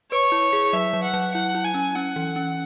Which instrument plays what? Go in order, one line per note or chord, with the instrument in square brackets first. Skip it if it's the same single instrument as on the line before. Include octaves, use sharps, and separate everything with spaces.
[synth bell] B4 [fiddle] C#5
[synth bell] E4
G#4
[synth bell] F#3 [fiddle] E5
[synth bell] F#3
[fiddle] F#5
[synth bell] F#3
[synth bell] E4 [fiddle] F#5
[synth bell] E4
[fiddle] G#5
[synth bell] C#4
[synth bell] C#4 [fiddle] F#5
[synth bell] E3
C#4